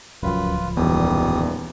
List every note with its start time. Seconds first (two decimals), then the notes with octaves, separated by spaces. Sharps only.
0.23 D1 C#2 F#2 F3 F4 B4
0.77 D#1 E2 G3 D#6